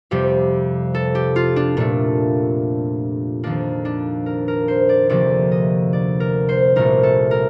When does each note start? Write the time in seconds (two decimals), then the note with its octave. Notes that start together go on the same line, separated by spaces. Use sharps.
0.11 F2 C3 G3 G4
0.95 A4
1.15 G4
1.36 F4
1.56 D4
1.77 A#2 A3 D4
3.43 F2 D#3 A#3 D4
3.85 D4
4.26 A#4
4.48 A#4
4.68 C5
4.89 D5
5.09 D2 C3 F3 A#3 D5
5.52 D#5
5.93 D5
6.20 A#4
6.49 C5
6.76 C2 A#2 A3 A#4
7.03 A4
7.31 A#4